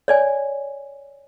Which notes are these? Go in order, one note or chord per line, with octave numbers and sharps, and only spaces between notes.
C#5 D5 G#5